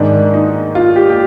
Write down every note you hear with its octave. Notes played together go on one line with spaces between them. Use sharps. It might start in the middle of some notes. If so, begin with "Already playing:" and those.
Already playing: G#2 D#3 D4
D#4
F4
G4
G4